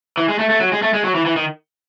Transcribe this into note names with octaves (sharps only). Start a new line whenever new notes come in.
E3
G#3
A3
A3
F#3
G#3
A3
G#3
F#3
E3
E3
D#3